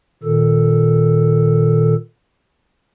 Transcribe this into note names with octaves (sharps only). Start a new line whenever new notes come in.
A#2 D#3 A4